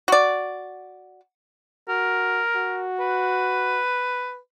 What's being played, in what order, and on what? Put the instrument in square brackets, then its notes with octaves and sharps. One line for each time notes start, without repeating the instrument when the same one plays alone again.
[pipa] F#4 D5
[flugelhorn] F#4 [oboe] A#4
[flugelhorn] F#4
[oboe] B4